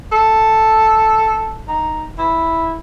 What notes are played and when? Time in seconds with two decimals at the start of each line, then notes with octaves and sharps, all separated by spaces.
0.12 A4
1.68 D#4
2.18 E4